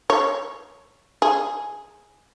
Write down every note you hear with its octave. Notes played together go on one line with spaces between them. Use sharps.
C#5
G#4